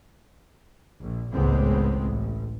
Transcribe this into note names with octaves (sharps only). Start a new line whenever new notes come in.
A#1
G#1 C#2 A2 G#3 B3 C4
A1